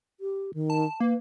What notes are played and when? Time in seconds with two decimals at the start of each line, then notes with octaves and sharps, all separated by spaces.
0.20 G4
0.54 D#3
0.70 A5
1.00 A#3 B4